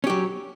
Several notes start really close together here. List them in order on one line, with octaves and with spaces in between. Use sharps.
C#4 G4 F#3